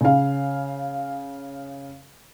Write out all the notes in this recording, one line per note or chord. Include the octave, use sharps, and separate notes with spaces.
C#3 F5